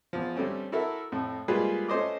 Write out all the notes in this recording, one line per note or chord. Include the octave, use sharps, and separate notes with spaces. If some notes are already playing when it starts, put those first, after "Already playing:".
E2 F3
D3 G3 A3 C4 C#4
E4 F#4 A4 A#4 E5
F2 A2
G3 G#3 A#3 F4 G#4 B4
A3 C#4 C5 D#5 D6